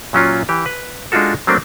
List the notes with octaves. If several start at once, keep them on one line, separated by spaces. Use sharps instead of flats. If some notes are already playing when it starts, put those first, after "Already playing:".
A#2 F#3 C#4 F4
E3 G4
B4
G#3 D4 D#4 F4 F#4 A4
F#3 A3 A#3 C4 D4